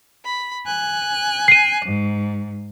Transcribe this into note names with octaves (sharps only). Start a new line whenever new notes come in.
B5
G#5 F#6
C7 D#7
G#2